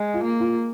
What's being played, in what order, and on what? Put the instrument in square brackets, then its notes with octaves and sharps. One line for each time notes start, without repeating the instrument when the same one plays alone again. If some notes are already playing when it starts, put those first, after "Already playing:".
Already playing: [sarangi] G#3
[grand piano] F4
[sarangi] A#3
[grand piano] F4